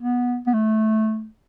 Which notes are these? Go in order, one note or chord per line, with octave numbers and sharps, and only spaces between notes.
B3
B3
A3